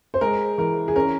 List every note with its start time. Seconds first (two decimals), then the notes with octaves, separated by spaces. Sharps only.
0.14 C5
0.21 G#3 A#4
0.58 E3 A#4
0.88 G#4
0.96 C#4 A#4